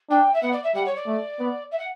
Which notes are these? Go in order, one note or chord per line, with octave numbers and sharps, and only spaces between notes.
D4 G5
E5
B3 F#5
D5
E5
G3 F#5
C#5
D5
A3
B3
E5
F#5